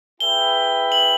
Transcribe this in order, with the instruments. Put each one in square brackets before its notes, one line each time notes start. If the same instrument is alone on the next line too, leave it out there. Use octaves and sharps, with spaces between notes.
[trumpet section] E4 G#4 B4 E5 G5 [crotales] G7
[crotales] F#7